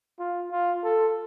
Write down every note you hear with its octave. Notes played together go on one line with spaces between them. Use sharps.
F4
F4
A4